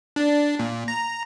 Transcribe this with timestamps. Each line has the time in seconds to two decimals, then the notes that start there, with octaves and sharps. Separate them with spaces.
0.16 D4
0.59 A#2
0.88 A#5